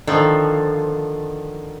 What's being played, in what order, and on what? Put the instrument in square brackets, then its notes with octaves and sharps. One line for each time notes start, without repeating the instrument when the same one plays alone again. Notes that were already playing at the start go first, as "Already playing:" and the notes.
[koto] D3 D#3 F3